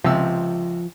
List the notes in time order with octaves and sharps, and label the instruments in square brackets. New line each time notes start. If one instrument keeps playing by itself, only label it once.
[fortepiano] C#2 C3 E6 [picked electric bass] F3